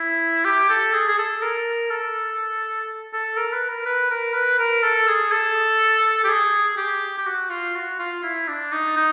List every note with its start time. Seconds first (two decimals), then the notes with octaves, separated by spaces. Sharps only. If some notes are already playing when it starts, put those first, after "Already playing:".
Already playing: E4
0.45 G4
0.70 A4
0.93 G#4
1.08 G#4
1.19 A4
1.42 A#4
1.90 A4
3.13 A4
3.37 A#4
3.53 B4
3.69 A#4
3.85 B4
4.10 A#4
4.34 B4
4.59 A#4
4.83 A4
5.08 G#4
5.32 A4
6.24 G4
6.29 G#4
6.77 G4
7.18 G4
7.26 F#4
7.50 F4
7.75 F#4
7.99 F4
8.23 E4
8.48 D4
8.72 D#4
8.97 D#4